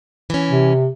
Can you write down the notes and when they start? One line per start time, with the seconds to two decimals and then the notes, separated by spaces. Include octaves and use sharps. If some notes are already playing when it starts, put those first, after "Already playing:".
0.30 E3 C#4
0.50 C3